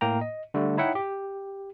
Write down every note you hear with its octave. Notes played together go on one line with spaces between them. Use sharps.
A2 A#3 G5 A#5
D#5
D3 G3 A3
D#4 E4 C#5 E5 F#5 G5
G4